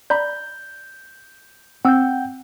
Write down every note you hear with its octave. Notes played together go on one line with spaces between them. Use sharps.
D5 A#5 B5 G6
C4 F#5 G5 E6 G6